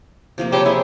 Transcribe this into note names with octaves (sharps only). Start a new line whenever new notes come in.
C3 F3 A#3
C#3 F#3 G4 A4 C5 G5
E4 G#4 C#5